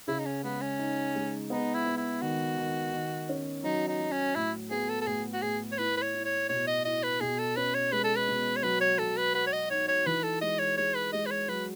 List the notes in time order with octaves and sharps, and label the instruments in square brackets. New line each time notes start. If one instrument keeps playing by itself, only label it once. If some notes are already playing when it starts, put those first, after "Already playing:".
[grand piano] C#3 [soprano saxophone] E4
[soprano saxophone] D#4
C#4
[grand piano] G#3 [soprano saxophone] B3
[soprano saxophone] C#4
[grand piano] D#4
G#3
[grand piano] B3 [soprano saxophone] D#4
[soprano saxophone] E4
[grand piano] B3
[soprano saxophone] E4
[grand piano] D#3 [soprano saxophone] F#4
[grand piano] D#3
D#3
C#4
[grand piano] F#3 [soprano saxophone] D#4
[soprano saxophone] D#4
[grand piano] F#3
[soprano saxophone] C#4
[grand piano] A2 [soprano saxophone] E4
[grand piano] B3 [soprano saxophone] G#4
[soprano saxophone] A4
A4
[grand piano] A2 [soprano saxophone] G#4
[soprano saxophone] F#4
[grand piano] A2 [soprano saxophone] G#4
[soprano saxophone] C#5
[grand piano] E4 [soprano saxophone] B4
[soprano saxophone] B4
C#5
[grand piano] E4
[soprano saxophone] C#5
[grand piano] B2 [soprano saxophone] C#5
[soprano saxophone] D#5
[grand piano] E4 [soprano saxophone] D#5
[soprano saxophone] B4
[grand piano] B2 [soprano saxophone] G#4
[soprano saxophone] A4
[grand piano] C#4 [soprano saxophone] B4
[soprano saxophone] C#5
[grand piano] G#3 [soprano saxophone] B4
[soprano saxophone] A4
B4
[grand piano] B2
[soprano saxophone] C#5
[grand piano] F#3 [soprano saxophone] B4
[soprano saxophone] C#5
[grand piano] F#3 [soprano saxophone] A4
[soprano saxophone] B4
[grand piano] F#4 [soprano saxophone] B4
[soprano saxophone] C#5
D#5
[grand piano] D#4 [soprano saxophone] C#5
[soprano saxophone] C#5
[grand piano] E3 [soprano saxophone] B4
[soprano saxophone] A4
[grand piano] G#3 [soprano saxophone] D#5
[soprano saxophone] C#5
[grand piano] G#3 [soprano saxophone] C#5
[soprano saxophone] B4
[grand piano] G#3 [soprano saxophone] D#5
[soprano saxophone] B4
C#5
[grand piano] F#3 [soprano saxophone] B4